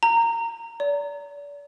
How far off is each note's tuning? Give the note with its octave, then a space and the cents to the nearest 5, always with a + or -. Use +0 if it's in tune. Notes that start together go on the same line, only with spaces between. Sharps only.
A#5 -15
D5 -35